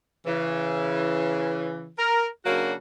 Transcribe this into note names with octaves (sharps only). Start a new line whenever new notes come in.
C#3 E3
A#4
C#3 F#3 A#3 D4 F#4